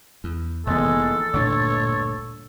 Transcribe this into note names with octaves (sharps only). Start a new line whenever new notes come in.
E2
F1 A#2 D#3 E3 G#3 B3 A4
G1 D2 A#2 D4 C#5